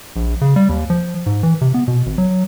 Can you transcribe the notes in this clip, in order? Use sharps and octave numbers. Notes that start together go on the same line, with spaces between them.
A#1
C#3
G3
D#2
F3
G#2
E3
C3
B3
B2
G#1
F#3